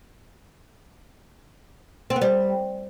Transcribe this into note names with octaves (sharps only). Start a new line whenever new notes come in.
C4
B3
G3